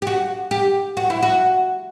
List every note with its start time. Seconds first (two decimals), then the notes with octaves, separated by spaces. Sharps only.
0.02 G4
0.07 F#4
0.51 G4
0.97 F#4
1.10 E4
1.23 F#4